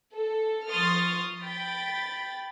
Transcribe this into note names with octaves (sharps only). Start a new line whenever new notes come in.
A4
F3 C6 C#6 D#6 F6 A6
G5 B5 A6